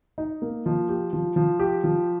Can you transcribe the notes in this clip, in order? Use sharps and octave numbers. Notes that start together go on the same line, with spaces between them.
D#4
A#3
F3
G4
F3
F3
G4
F3